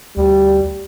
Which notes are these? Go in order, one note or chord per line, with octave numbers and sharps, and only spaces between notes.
D2 G3